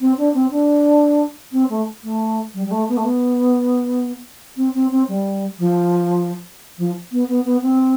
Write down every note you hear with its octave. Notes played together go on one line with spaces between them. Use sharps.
C4
D4
C4
D4
C4
A3
A3
G3
G3
A3
B3
A3
B3
C4
C4
C4
G3
F3
F3
B3
B3
B3
C4